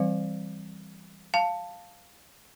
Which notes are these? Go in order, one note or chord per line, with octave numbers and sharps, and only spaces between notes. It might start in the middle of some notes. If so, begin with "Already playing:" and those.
Already playing: E3 G3 C4 D5 F5
F5 A5